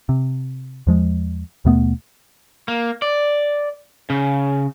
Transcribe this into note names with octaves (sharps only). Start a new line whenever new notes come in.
C3
E2 F3 G#3
D#2 B2 A3 B3
A#3
D5
C#3